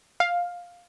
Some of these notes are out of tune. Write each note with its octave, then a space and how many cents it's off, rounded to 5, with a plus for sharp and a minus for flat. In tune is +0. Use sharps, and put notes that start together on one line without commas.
F5 +10